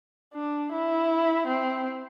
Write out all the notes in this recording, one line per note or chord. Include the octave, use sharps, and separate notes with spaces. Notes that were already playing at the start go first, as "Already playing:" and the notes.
D4
E4
C4